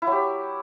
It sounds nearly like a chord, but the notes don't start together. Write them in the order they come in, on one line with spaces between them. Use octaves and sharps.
E4 F#3 G4